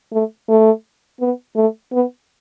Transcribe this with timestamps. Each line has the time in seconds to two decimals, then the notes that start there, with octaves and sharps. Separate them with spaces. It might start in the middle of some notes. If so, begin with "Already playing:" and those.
0.12 A3
0.49 A3
1.20 B3
1.56 A3
1.92 B3